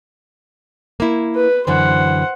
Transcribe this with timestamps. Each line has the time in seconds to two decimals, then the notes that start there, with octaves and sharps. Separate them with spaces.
1.00 A#3 E4
1.36 B4
1.67 F#2 D3 E3 C5 F#5